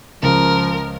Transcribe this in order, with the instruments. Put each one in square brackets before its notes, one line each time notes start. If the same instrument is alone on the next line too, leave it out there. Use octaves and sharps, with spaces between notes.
[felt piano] C#2 [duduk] F3 [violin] A#4